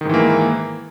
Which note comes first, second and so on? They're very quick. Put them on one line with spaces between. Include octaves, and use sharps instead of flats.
D#3 G#2 E3 A#3